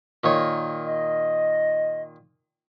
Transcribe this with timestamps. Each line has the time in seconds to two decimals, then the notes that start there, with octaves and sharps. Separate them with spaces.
0.24 A#2 D#3 C#5
0.85 D#5